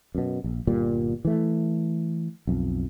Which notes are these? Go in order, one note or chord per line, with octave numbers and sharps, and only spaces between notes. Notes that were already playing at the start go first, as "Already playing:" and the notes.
F#2 B2
A#1
G1 A#2 G3
E3 A3
B1 F2